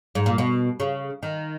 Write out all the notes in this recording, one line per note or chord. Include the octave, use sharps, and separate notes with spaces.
G#2
A#2
B2
C#3
D#3